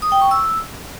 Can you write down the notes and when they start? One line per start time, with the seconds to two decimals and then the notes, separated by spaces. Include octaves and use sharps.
0.02 D#6
0.12 G5
0.21 C#6
0.31 E6